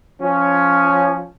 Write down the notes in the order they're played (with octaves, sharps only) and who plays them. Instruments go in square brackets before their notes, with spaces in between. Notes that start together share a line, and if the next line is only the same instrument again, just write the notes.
[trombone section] F3 C#4